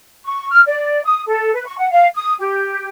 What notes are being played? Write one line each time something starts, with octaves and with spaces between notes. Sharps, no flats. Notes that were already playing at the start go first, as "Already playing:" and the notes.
C#6
F6
D5
D#6
A4
B4
C#6
F#5
F5
D#6
G4